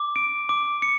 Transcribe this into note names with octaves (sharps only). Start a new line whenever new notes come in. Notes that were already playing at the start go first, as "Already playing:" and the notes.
Already playing: D6
D7
D6
C#7